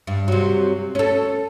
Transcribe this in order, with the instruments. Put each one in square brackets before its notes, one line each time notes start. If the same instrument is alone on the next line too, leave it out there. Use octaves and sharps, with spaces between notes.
[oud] G2
C3 F#3
C#4 A4